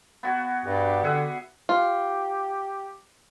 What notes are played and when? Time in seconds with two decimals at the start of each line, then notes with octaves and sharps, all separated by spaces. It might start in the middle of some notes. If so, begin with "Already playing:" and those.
0.23 B3 F#4 G#5
0.65 G2 D4 G4
1.04 D3 G#4 E5 F#5
1.69 F4 G4